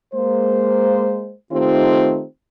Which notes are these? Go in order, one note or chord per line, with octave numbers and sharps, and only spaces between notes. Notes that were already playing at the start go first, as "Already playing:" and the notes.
G#3 A#3 C5
D#3 A3 C4 D#4 F4 G4